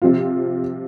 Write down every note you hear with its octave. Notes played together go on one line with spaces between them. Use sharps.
C3 F3 C4 F4